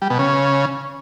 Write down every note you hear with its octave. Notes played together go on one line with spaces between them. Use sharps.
G3
B2
C#3